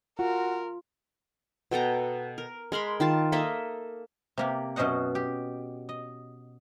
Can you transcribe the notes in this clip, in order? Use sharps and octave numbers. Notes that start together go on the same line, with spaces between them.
F4 F#4 A#4
B2 A4 G5 A#5
A#4
G#3 A#4 B5 C6
D#3 F4 A5
A#3 A4 D#5 E5
C3 A#3 G4
F#2 B2 C#4 C5 D#5 F#5
G4
D#5